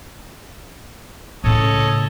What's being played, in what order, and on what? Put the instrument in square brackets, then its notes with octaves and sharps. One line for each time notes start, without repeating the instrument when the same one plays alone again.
[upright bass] A2 C#3 [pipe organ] A4 C#5 D#5